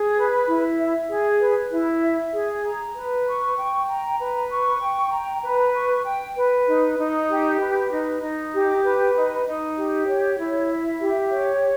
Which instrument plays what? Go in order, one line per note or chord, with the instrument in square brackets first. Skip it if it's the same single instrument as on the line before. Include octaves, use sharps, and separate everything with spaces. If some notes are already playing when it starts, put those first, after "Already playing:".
Already playing: [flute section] G#4
B4
E4
E5
G#4
B4
E4
E5
G#4
A#5
B4
C#6
G5
A#5
B4
C#6
G5
A#5
B4
C#6
G5
B4
D#4
D#4
G4
B4
D#4
D#4
G4
B4
D#4
D#4
G4
C#5
E4
E5
G4
C#5